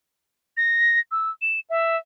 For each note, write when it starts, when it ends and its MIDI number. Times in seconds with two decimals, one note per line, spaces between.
0.57 0.99 94
1.11 1.30 88
1.42 1.60 100
1.70 1.97 76